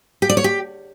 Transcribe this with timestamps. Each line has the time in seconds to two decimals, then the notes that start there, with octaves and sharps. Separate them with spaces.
0.22 G4
0.29 D5
0.37 C#5
0.44 G4